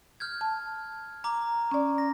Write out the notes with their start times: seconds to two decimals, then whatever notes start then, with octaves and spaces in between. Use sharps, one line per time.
0.20 F6 G6 G#6
0.41 A5
1.24 A#5 D6
1.71 C#4 D5
1.98 A#6